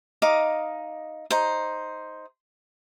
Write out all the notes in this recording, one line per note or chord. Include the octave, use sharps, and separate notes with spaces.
D#4 D#5 F5 D6
D#4 C5